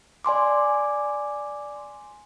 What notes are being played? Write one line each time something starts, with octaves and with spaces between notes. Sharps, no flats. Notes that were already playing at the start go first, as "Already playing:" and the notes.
D5 G#5 C6 D6